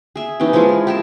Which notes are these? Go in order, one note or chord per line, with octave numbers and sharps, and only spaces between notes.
G#4 E5
E3 C#4 D#4 G4
F3 G#3 E4 F4
G#4
G4 A#4 A5